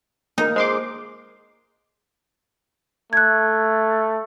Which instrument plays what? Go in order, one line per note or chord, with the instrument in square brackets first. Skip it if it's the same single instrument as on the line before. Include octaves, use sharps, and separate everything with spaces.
[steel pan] A#3 A#4 [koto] D#4
[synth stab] G#3 C6 D6 [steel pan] C5
[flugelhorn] A3 [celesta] F#6 G#6